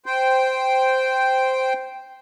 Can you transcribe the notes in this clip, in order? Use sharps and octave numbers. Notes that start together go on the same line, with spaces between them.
C5 G5